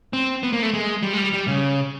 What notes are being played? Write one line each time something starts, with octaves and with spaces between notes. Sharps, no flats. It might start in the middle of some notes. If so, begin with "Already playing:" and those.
C4
B3
A#3
A3
G#3
G3
G#3
G3
G3
C#3